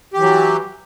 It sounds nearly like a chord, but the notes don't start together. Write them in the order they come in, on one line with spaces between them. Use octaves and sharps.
G4 E3 F#3